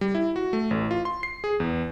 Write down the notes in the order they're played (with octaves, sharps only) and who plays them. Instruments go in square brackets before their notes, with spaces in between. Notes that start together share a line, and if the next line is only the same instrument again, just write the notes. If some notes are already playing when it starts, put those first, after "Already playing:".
[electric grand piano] G3
E4
F#4
A3
A1
F4
C6
C7
G#4
E2